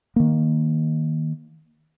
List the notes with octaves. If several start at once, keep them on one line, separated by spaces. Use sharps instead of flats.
D#3 A#3